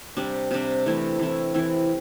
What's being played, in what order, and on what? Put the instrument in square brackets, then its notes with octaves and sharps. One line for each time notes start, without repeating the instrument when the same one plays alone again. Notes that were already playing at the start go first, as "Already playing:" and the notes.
[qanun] C3 G3 D4
C3 G3 D4
E3 A3 C4 E4
E3 A3 C4 E4
E3 C4 E4